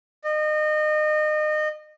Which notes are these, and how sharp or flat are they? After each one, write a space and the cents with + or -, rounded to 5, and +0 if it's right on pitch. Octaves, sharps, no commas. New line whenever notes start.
D#5 -30